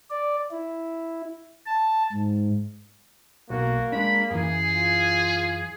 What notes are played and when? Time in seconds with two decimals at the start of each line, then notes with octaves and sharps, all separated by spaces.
0.10 D5
0.51 E4
1.66 A5
2.13 G#2
3.50 B1 A#3 F#4
3.92 G#3 D4 B5
4.31 F#2 E3 G#4
4.74 F4